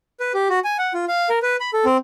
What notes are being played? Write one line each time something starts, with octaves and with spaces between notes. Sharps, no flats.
B4
G4
F#4
G#5
F#5
F4
F5
A#4
B4
B5
A4
C4